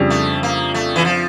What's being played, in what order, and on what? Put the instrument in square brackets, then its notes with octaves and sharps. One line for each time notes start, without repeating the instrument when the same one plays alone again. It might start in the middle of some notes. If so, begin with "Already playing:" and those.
Already playing: [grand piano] F2 C#3 G3 D4 G4
[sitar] A3
A#3
A3
E3
F3